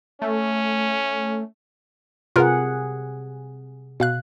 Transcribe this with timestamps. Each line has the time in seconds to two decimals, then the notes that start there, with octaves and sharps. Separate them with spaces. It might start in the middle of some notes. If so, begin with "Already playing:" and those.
0.22 A3 C#4
2.36 C3 F4 G#4 A#4 B4 F#5
4.00 B2 F5 F#6